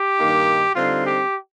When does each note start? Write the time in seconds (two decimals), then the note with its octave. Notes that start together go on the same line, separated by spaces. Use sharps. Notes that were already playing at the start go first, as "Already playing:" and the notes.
Already playing: G4
0.19 G2 D#3 A#3 D#4
0.76 D3 G3 C4 D#4 F4
1.05 G4